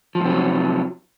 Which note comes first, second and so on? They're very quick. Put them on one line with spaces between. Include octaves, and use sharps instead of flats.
F3 A2 C3 F#3